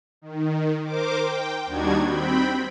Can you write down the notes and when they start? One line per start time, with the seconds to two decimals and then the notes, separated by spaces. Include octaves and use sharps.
0.22 D#3
0.84 A#4 C5 D6
1.19 G5
1.66 D#2 G3 D4 D#4 F#4 G#6
2.07 C4 G5 B5